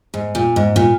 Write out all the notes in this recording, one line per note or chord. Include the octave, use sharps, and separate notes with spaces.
G#2
A#2
G#2
A#2